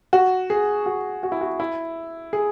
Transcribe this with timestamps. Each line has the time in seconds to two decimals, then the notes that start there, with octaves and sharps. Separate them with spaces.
0.13 F#4
0.50 G#4
0.86 F#4
1.23 F#4
1.32 E4
1.41 F#4
1.60 E4
2.33 G#4